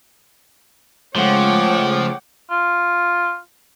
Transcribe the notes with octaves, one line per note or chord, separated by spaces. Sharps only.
C#3 F3 G#3 A3 C#5 F#5 G5 D6
F4